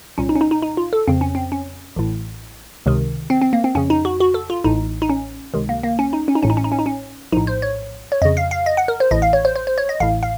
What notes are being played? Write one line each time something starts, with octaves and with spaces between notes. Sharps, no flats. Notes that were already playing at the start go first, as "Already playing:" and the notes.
C2 A#2 C#4
D#4
C#4
D#4
D#4
D#4
F4
A4
F2 C#3 C4
C#4
C4
C#4
A1 A2
C#2 C3 D#3
C4
C4
A#3
C4
F2 C#3 C#4
D#4
F#4
F#4
A4
F4
A1 A2 D#4
D#4
C#4
C#2 C3 D#3
A#3
A#3
C#4
D#4
C#4
D#4
A1 A2 C#4
D#4
C#4
D#4
C#4
D#4
C#4
A#1 A2 D#4
C5
C#5
C#5
F2 C#3 D#5
F5
F5
D#5
F#5
A#4
C5
A1 A2 D#5
F5
C#5
C5
C5
C5
C#5
D#5
A1 A2 F5
F5